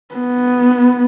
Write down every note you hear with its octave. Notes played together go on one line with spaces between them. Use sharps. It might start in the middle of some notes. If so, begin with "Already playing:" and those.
B3